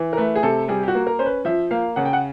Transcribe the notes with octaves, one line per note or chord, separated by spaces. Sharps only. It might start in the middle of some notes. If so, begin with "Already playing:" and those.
Already playing: E3
A#4
A3 B4
G#4
C3 A4
G3 G#4
G4
F#4
A#3
A#4
C#4 C5
B4
F3 E5
A#3 F5
C#3 F#5
G5
F#5